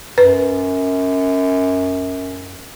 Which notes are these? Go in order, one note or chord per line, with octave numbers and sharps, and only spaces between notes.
F#2 B4